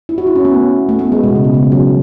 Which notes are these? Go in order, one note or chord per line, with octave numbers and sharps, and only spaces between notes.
E4
F#4
E4
C#4
B3
A3
A3
B3
G#3
B2
C#3
B2
C#3
E3
F#3